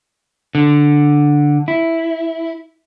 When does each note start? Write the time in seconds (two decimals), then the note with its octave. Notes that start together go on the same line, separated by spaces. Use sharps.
0.55 D3
1.68 E4